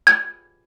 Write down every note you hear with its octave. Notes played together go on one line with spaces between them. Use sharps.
G#6